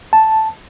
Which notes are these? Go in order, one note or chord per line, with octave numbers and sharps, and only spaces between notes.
A5